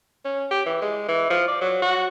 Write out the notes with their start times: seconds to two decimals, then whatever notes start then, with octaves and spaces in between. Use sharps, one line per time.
0.25 C#4
0.51 G4
0.66 E3
0.81 G#3
1.08 E3
1.30 F3
1.48 D5
1.61 F#3
1.82 F#4